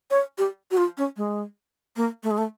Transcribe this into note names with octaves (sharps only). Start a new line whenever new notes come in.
C#5
G4
F#4
F4
C#4
G#3
A#3
A3
G#3
A3